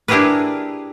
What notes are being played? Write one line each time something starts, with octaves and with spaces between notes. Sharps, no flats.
D4 E4 G4 G#4 A#4 B4